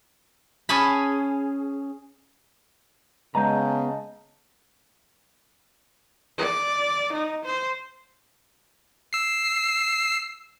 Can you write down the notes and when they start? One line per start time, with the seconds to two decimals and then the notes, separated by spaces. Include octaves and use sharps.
0.69 C#4 G#4 C#5 G#5 A5 B5
3.35 C#3 G#3 B3 D#5 A5 A#5 G6
6.38 D5
7.13 D#4
7.45 C5
9.13 E6 C7